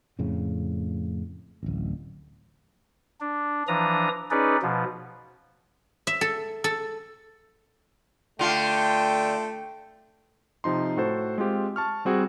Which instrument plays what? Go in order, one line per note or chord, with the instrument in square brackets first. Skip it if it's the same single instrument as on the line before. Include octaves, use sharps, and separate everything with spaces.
[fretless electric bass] F2 A2 C#3
D1 A1
[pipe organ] D4
E3 F3 D4 A#5 D#6
C#4 D#4 G#4 B4 D5
B2 F3
[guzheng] E5
A4
A4
[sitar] D3 F4 [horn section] A3 G5
[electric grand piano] C3 F3 D#4 C6
A2 F#4 A4 C5
G#3 C4 F4 G4
A5 C#6 F6
G3 C4 F#4 G#4